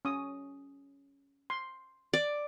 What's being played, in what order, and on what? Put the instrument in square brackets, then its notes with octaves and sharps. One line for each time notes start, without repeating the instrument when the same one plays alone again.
[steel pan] C#4 D#6
C6
[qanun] D5